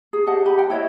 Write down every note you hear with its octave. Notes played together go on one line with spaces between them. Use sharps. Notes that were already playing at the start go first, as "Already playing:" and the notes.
G#4
G4 D#5 F#5 A5
G4 B5
F#5 G5
E4 C#5 D#5 E5